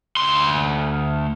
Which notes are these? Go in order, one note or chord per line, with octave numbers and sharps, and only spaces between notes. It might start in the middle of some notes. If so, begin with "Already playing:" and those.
D2 C6